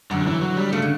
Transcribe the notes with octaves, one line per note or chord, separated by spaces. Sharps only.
F#2 D3
F#3
E3
F#3
G3
C#3 A3
D3